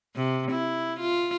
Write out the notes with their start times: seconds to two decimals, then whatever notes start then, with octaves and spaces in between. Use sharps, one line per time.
0.16 C3
0.51 E4
1.00 F4